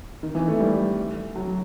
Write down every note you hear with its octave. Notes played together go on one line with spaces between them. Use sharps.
D#3
E3
A3
G3
F#3